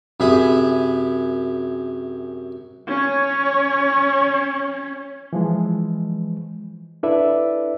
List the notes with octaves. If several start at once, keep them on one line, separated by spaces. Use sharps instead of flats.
F#2 C3 G#4 E5 G#5 B5
C#4 C#5
E3 F3 G#3
D4 E4 A4 B4 D5 E5